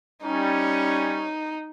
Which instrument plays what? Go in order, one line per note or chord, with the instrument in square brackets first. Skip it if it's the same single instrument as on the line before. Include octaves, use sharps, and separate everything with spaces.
[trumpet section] G3 C#4 [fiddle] D#4